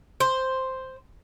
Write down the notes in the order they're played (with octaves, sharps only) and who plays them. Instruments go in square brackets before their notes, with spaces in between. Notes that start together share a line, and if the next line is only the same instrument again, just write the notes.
[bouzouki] C5